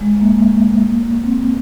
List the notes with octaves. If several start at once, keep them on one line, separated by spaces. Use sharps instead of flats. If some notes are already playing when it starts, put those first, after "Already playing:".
G#3
A#3
C4